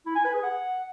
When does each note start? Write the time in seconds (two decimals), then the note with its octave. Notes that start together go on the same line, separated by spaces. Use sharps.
0.06 E4
0.15 G#5
0.24 B4
0.34 G#4
0.43 F#5